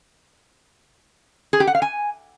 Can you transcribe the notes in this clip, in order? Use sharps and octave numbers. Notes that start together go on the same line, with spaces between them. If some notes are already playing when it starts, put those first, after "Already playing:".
G#4
G4
F#5
F5
G#5